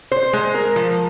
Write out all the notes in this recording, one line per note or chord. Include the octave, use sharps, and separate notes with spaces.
C5
G#3
A#4
F3